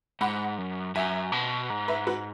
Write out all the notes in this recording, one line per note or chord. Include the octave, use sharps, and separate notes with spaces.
G#2 F#5 B5
F#2
F#2 E5 G#5
B2
G#2
B4 E5
F#4 B4